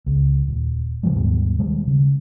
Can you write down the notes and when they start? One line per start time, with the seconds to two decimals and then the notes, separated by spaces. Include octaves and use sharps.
0.06 C#2
0.48 D#1
1.03 C3 E3 F3 G#3
1.16 D#2 G#2 B2 G3
1.58 B2 D#3 G3 G#3
1.87 C#3